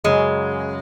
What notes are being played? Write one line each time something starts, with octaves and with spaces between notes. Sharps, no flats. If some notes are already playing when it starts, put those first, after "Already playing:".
F#2 C#3 F#3 G#3